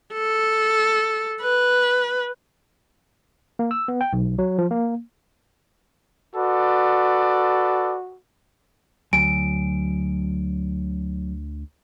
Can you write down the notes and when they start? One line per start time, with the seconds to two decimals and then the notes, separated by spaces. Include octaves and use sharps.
0.14 A4
1.41 B4
3.59 A#3
3.71 E6
3.88 B3
4.01 G5
4.13 B1
4.39 F#3
4.59 F3
4.71 A#3
6.35 F#4 A4 B4 D5
9.13 D2 F#3 G#5 D7